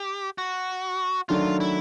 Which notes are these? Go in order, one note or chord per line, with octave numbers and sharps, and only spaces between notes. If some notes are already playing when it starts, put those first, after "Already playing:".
Already playing: G4
F#4
D#3 F#3 A3 D4 F4
E4